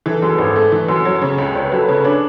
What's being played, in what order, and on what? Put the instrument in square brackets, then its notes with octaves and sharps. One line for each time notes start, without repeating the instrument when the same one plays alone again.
[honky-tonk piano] E3 [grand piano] A4
[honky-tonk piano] F#2 [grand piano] G#4
[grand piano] B4
[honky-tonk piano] G#1 [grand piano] A4
[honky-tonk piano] A3
E3
F#2
F#3
C#3
C#2
[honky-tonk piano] C#2 [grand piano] C#5
[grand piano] B4
[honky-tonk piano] F#3 [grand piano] A4
[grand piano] B4
[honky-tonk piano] C#3
[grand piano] B4
[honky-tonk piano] D4 [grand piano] C#5